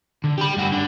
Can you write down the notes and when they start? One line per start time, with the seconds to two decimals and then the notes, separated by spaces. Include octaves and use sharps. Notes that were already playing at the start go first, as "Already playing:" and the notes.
0.24 D3
0.38 G4 B5
0.57 G2 F#4
0.72 D3